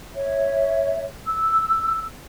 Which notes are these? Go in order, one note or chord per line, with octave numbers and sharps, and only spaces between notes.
C#5 E5
E6